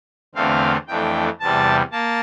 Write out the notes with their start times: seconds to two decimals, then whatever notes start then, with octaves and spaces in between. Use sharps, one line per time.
0.35 E2 D3 A3 C4 F5
0.87 F2 E3 A3 D4 G5
1.40 E2 C3 G3 A5
1.92 A#3 A5